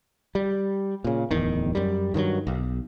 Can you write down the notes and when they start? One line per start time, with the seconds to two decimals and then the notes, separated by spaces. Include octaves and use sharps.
0.35 G3
1.04 A#2 C#3
1.31 D1 E2 D#3
1.75 F#2 G3
2.14 G2 D#3 F3 F#3
2.47 B1